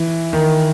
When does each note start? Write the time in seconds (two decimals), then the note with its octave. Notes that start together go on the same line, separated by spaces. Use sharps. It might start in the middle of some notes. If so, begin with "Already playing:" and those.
Already playing: E3
0.33 D#3